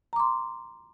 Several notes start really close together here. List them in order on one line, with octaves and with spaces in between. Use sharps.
A#5 D6 C6